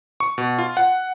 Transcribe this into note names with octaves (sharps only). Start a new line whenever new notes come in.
C#6
B2
F4
F#5